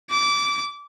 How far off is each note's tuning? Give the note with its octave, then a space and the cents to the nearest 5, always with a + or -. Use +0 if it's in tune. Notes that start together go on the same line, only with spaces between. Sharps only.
D6 -20